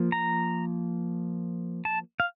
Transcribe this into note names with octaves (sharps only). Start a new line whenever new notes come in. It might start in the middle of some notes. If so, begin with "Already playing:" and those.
Already playing: F3 A#3
A#5
A5
F5